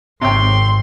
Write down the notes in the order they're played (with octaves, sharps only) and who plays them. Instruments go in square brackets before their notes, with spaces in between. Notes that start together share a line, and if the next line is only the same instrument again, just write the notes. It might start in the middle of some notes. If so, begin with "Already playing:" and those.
[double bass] G#1 [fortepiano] C3 C#5 G5 [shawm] C6